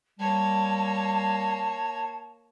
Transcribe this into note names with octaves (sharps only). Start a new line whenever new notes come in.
G3 A#3 C#5 A5